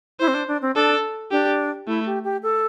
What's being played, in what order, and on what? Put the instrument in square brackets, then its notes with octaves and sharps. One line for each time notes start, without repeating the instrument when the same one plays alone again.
[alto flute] E4 [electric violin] C5
[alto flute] C4
D4
D4
C4
[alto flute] D4 [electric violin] A4
[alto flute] D4 [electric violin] G4
[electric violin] A3 [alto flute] E4
[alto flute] G4
G4
A4